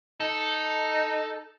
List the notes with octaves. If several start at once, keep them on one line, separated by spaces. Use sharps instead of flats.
D#4 A4